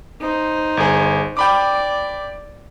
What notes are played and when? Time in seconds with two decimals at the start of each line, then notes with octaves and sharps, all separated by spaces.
0.21 D#4 C5
0.77 G1 G#4
1.37 D5 G5 B5 D6